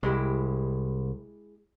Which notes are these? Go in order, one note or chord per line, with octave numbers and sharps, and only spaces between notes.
C2 G#3 E4 G4